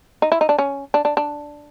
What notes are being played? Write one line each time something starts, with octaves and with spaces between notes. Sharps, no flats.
D#4
E4
D#4
D4
C#4
D4
D4
D4